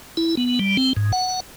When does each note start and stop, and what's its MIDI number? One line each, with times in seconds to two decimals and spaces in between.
0.17 0.35 64
0.37 0.59 59
0.59 0.77 55
0.77 0.93 60
0.97 1.12 44
1.12 1.40 78